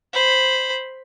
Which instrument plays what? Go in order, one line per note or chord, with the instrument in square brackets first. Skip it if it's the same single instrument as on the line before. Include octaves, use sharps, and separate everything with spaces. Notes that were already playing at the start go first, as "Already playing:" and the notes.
[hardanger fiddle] C5 B5